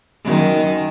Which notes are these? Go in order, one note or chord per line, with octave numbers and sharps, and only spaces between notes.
F#2 D#3